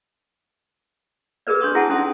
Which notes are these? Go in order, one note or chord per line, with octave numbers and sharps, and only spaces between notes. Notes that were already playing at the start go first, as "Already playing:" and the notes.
G4 G#4 A#4 B4 D5
D4 C6 C#6 D#6
E4 G#4 F#5 G#5 A5
C#4 D#4 C6 D#6